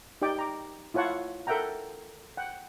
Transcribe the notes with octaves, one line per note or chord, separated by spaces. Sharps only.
D#4 G4 D5 G5 D6
A#5 D6
E4 F4 C#5 F#5 A5 C#6
A4 A#4 E5 F#5 G5 A#5
F#5 G5